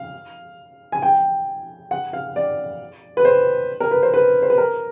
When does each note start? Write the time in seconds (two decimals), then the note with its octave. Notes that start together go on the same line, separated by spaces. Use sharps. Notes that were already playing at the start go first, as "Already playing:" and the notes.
Already playing: F5
0.92 G#5
1.02 G5
1.91 F#5
2.13 F5
2.36 D5
3.17 B4
3.25 C5
3.80 A#4
3.91 B4
4.02 C5
4.14 B4
4.42 C5
4.50 B4
4.58 A#4